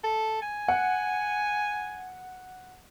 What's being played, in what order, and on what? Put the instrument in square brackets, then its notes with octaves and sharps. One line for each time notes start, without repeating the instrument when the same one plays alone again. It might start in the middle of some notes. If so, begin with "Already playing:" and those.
[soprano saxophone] A4
G#5
[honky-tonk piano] F#5